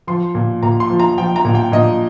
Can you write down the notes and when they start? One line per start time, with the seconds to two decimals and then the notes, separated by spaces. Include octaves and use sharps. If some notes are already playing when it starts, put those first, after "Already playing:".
0.07 F3 C6
0.35 A#2
0.63 A#2 A#5
0.80 C6
0.90 F3
1.00 A#5
1.18 F3 G5
1.36 A#5
1.45 A#2
1.55 G5
1.72 A#2 D#5